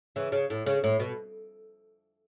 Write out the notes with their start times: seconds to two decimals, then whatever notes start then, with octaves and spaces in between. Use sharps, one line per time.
0.16 C#3 E3
0.32 C#3
0.50 A2
0.66 C#3
0.84 A2
1.00 B2